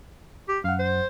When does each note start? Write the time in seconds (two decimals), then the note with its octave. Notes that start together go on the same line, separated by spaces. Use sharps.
0.48 G4
0.64 F#2 F5 F#5
0.79 C5